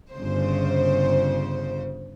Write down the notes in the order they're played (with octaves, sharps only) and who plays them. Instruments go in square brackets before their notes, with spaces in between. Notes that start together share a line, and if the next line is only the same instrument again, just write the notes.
[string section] G1 C#3 C5